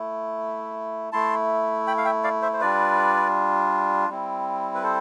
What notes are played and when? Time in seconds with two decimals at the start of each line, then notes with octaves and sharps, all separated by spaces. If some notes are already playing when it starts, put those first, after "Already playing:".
Already playing: A3 E4
1.12 A3 E4 A5 C6
1.87 G5 B5
1.98 F5
2.05 E5 G5
2.24 D5 F5
2.42 C5 E5
2.53 C5
2.61 G3 D4 F4 B4 D5
4.09 G3 C4 E4
4.75 B4
4.83 A4 C5